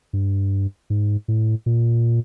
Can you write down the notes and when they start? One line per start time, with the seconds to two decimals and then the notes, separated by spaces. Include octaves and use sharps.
0.13 G2
0.90 G#2
1.28 A2
1.66 A#2